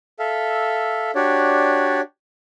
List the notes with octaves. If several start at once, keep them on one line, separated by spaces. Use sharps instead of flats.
A4 E5 F5
D4 F#4 G4 C#5 D5